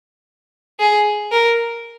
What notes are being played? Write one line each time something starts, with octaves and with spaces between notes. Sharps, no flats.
G#4
A#4